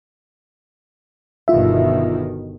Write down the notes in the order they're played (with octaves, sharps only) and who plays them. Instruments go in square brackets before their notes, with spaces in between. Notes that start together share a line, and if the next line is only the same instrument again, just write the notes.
[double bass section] G1 B2 D#3 [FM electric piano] F4 E5